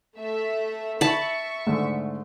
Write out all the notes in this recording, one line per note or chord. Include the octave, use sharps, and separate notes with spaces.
A3 E5
E5 A5 B5 C#6
G#2 D3 A3